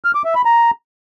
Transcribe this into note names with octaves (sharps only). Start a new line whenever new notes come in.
F6
D6
E5
B5
A#5